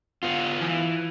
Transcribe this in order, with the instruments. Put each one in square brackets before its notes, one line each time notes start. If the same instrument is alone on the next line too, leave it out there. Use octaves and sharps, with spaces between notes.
[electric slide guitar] B3 F4
E3